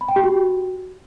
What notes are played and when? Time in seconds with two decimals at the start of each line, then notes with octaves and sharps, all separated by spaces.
0.01 B5
0.08 G5
0.16 G4
0.24 F#4